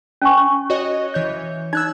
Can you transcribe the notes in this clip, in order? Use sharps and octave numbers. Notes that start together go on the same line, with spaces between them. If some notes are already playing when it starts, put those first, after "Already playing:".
C#4 G#5 C#6
F#4 C#5 D#5
E3 C#5 G6
D#4 E6 F#6 G#6